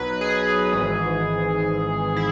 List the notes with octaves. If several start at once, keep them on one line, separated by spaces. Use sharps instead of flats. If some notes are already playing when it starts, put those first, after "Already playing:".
Already playing: B1 B2 F#3 B4
G#4
G#1 G#2 E3
E4